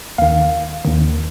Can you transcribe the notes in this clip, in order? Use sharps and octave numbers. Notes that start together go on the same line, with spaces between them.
D#2 D#3 F5
D#2 D#3